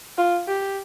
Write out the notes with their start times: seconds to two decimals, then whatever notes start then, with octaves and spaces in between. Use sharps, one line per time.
0.18 F4
0.48 G4